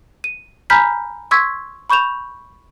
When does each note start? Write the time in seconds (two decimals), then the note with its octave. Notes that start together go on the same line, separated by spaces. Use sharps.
0.24 D#7
0.70 G#5 A#5 B5 F6 G6 B6
1.31 C6 C#6 E6 G#6 B6
1.90 B5 C#6 G6 E7 F7